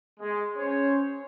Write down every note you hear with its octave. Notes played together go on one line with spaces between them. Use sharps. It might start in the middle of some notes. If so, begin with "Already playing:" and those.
G#3
C#4 C5 C#5